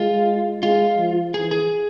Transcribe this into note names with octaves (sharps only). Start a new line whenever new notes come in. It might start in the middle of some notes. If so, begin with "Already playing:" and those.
Already playing: G#3 F4
G#3 F4
F3
E3 G#4
G#4